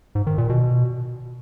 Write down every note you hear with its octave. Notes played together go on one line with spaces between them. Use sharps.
G#2
D#3
A#2
B2